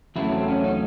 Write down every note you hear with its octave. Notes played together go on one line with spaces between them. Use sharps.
E2 C#3 F#3 A3 E4
C4
C#4
D#4